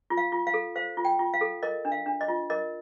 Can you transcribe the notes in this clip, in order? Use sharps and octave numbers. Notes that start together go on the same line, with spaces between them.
F4
F5
F4
F5
A4
C5 F5
F4
G5
F4
F5
A4
A#4 D#5
D4
F5
D4
D#5
F4
A#4 D#5